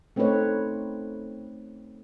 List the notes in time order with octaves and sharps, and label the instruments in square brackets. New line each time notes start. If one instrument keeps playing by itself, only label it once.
[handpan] A3 C4 C#4 D#4 B4 C#5